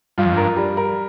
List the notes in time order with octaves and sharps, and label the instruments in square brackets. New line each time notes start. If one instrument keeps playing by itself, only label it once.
[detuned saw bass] G2 [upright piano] F4
[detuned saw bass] F2
[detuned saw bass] G2 [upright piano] A#4
[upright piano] G3
A#4